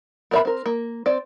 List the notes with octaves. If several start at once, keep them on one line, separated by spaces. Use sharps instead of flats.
B3 A#4 D5 E5 B5
C4 A#4
A#3
C4 D5